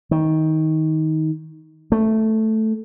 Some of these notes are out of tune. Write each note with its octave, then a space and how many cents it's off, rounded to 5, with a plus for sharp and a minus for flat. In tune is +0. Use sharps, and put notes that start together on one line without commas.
D#3 +15
A3 +0